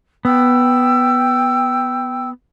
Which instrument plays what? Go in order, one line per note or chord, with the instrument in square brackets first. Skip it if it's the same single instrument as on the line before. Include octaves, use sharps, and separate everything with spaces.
[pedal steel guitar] B3 [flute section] G5 E6